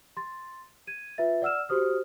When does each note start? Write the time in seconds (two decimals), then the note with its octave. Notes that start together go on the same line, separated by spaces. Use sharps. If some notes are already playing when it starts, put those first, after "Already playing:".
0.17 C6 A6
0.87 G#6 D#7
1.18 F4 B4 E5 A6
1.42 D5 F#5 E6 F6 E7
1.69 F#4 G4 C5 D#6 F6